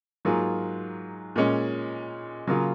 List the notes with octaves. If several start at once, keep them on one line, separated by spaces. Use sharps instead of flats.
G#2 F#3 A#3 F4 G#4
A#2 G#3 C#4
C#3 F#3 A#3 F4 G#4